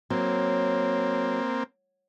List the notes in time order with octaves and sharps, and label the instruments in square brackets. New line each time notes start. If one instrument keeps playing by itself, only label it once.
[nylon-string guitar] F#3 [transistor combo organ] A#3 C4